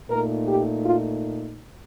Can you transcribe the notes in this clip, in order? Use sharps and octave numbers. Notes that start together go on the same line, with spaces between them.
A#2 A3 D#4 A#4
G4
F4